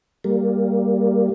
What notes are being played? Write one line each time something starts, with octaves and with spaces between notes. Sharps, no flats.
G3 A#3